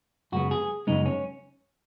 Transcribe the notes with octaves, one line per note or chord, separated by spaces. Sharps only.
F#2 C#3 G#3 B3 F#4
G#4
F#2 C#3 G#3 B3 D#4
C#4